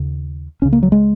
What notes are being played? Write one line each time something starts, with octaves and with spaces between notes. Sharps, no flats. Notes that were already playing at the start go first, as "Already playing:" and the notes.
Already playing: D#2 C#3
C#2 C#3 C#4
A#3
F#3
G#3